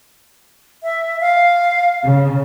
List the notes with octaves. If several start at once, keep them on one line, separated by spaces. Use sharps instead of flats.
E5
F5
C#3